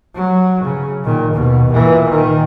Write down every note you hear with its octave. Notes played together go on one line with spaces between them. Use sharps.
F#3
C#3
A#2 D#3
D#2 B2
A#2 E3
D#3